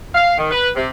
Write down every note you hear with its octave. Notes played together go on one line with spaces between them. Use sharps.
F5
D#3
B4
C3